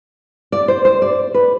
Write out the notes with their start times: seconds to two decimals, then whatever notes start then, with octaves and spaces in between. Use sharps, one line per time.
0.52 D5
0.68 C5
0.85 C5
1.02 D5
1.34 B4